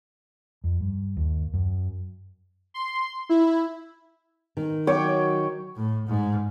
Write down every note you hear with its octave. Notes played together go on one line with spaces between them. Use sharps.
F2
G2
D#2
F#2
C6
E4
D#3
F#3 C#5 G5 D6
A2
G#2